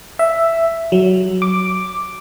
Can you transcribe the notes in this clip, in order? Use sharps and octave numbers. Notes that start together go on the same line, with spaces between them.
E5
F#3
D6